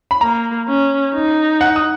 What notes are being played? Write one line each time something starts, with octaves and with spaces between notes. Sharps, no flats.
B5
A#3 A#5
C#4
D#4
F#5
D#6